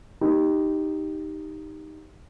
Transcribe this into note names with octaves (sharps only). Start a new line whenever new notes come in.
D#4 G4